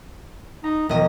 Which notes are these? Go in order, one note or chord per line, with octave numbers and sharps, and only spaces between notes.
D#4 A#5
E1 B2 D#3 F3 D#5